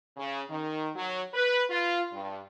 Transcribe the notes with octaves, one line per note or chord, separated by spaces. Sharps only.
C#3
D#3
F#3
B4
F4
G2